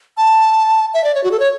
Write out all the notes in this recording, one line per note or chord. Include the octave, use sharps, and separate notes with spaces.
A5
E5
D5
C#5
F#4
A4
C#5